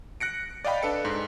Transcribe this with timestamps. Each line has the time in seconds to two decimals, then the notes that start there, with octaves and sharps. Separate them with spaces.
0.20 F#6 A#6 C#7 D7
0.65 D5 D#5 F5 G5 B5
0.83 D4 A4 B4 C#7
1.05 G#2